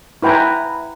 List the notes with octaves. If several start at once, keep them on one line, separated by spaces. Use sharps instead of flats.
E4 B4 G5 G#5 A#5